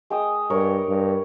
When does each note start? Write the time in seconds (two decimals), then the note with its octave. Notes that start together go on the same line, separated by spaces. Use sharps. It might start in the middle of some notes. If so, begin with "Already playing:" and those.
0.10 G#3 G5 D#6
0.50 G2 A#4 C#5
0.89 G2